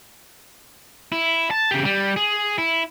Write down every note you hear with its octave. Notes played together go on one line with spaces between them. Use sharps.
E4
A5
C#3 G4
G3
G#4
E4